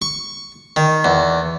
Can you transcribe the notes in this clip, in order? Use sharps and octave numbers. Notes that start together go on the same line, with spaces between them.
C#6
D#3
E2